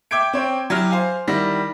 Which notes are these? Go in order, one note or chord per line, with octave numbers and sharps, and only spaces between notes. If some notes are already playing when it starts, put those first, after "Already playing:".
E5 G5 D6 G6 G#6 D7
C4 C#5 G5
F#3 E4 G4 F6
C5 F5 G#5
D#3 G3 E4 F#5 A#6